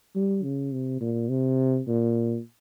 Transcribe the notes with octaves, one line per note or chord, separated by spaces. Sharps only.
G3
C#3
C3
A#2
C3
A#2